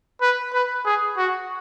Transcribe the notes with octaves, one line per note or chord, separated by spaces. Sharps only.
B4
B4
G#4
F#4